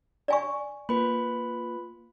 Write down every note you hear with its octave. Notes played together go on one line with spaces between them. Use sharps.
D5 G#5 C#6
A#3 F4 B4 B5